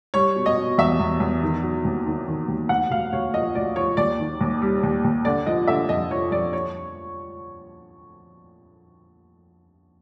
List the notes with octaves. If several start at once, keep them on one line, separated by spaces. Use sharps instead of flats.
G3 C#5
B2
D#5
B2
E2 E5
E2
E2
D#3
F#3
D#2
D#3
D#3
D#2
D2 F#5
D2 F5
D2 C#5
F3 D#5
D2 D5
F3 C#5
D#2 D5
D#3
D#2
G3
D#2
D#2
D3 D5
F3 D#5
D3 E5
F2 D#5
F3 C#5
F2 D5
C#5